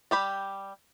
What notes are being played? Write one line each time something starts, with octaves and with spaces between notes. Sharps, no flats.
G3 G4 B5